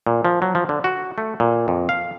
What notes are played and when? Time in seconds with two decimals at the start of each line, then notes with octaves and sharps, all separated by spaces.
0.07 A#2
0.25 F3
0.42 F#3
0.55 F3
0.69 D3
0.84 F#4
1.18 A3
1.40 A#2
1.68 F2
1.89 F5